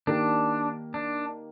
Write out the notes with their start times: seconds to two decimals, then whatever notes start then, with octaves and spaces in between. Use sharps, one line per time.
0.07 D#3 A#3 D4 D#4 G4
0.94 D4